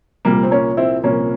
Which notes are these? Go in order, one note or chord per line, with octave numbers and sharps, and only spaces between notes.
C2 A#2 F3 G3 A#3
C4
A#3 C#4
C4 E4
C2 A#2 F3 A#3 C#4